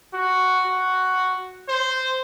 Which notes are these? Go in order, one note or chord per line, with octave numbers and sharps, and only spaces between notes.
F#4
F#4
C5